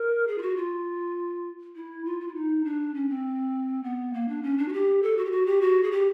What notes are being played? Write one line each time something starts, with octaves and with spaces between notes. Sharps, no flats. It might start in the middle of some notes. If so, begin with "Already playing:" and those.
Already playing: A#4
G#4
F4
F#4
F4
E4
F4
F4
E4
D#4
D4
C#4
C4
B3
A#3
D4
C#4
D4
F#4
G4
A4
F#4
G4
F#4
G4
F#4
G#4
G4